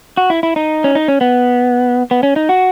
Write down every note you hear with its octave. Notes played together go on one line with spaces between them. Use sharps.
F#4
E4
E4
D#4
C#4
D#4
C#4
B3
B3
C#4
D#4
F#4